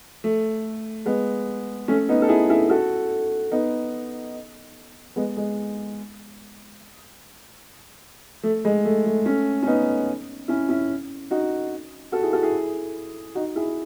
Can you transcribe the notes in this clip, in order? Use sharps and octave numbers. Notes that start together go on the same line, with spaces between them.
A3
G#3 B3
A3 C#4
B3 D#4
A4
E4 G#4
E4 G#4
F#4 A4
B3 D#4
G#3 B3
G#3
A3
G#3
A3
A3
A3 C#4
C#4
B3 D#4
C#4 E4
C#4 E4
D#4 F#4
F#4 A4
E4 G#4
F#4 A4
E4 G#4
D#4 F#4
E4 G#4